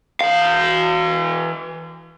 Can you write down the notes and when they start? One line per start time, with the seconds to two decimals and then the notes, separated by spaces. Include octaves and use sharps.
0.21 E3 F5